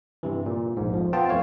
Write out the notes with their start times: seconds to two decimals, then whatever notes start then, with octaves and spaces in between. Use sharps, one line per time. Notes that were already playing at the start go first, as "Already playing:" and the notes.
0.23 G2 C3 E3
0.46 A#2
0.77 A#1 G#2
0.94 F2 F3
1.13 B3 C4 F4 G5 A5
1.29 F2 E3 A3 C#5 F5